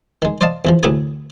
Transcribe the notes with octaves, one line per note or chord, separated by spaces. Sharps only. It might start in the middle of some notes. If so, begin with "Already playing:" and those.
D#3 G#3
C5 D5 D#5 F5 A5
E2 E3 F3
D2 A2 E4 G4 G#4 G#5